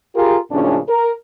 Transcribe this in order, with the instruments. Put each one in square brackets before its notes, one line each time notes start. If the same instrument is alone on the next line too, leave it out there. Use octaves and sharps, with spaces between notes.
[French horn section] F4 G4 G#4 A#4
D#2 A2 C#3 F3 C#4 D4
A#4